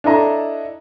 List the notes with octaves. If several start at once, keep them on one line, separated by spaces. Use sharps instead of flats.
D4 E4 A4 D#5 A#5